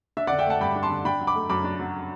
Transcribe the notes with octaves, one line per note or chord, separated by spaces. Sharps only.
D4 E5
D5 F#5
D3
E5 G5
A3 F#5 A5
G2 G5 B5
D4
A5 C6
D3
D4 G5 B5
F#3
B5 D6
A3
F#2 B5 D6
D4
F#3